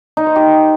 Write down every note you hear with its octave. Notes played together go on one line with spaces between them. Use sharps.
D#4
C5
G4